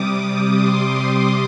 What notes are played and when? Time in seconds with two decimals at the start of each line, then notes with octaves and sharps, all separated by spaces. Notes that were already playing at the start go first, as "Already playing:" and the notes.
Already playing: C3 G3 D6 D#6
0.14 D6
0.54 C6